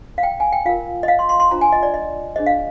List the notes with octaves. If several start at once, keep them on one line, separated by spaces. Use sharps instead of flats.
F5
G5
G#5
G5
F4 A#4 F5
D#5
F5
C6
C6
C6
D4 F4 C5 A#5
G#5
D#5
D5
D#5
D4 G#4 C5 D#5
F5